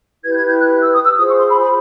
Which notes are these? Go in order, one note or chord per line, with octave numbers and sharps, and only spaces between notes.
E4 G4 B4 G#6
G6
G#6
G6
F#6
E6
D#6
E6
F4 G#4 C5 D#6
C#6
C6
B5
B5